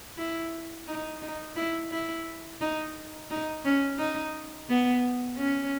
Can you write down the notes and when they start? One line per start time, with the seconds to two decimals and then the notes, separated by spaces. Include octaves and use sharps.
0.18 E4
0.88 D#4
1.22 D#4
1.56 E4
1.92 E4
2.61 D#4
3.30 D#4
3.65 C#4
3.99 D#4
4.69 B3
5.37 C#4